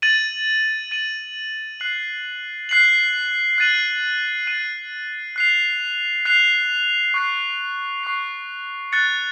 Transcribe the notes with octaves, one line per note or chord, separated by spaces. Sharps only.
A6 D#7 F#7
A6 D#7 F#7
F#6 C7 F#7
F#6 C7 F#7
F#6 A6 D#7 F#7
F#6 A6 D#7 F#7
F#6 C7 F7
F#6 C7 F7
C#6 F#6 C7
C#6 F#6 C7
F#6 A6 C#7